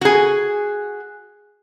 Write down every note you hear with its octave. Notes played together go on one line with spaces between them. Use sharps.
F#4 G#4